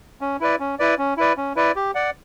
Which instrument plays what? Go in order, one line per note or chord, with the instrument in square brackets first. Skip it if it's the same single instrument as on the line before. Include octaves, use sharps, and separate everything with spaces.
[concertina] C#4
E4 B4 D5
C#4
E4 B4 D5
C#4
E4 B4 D5
C#4
E4 B4 D5
G4
D5 F#5